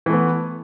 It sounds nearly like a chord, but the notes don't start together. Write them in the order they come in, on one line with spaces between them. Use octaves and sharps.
E3 A3 B3